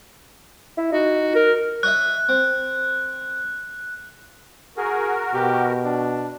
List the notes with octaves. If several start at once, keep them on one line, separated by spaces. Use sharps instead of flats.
E4
D#4 F#4
A#4
C#5 D#5 E5 F#6
C4
F#4 G#4 A#4
B2 G4
D4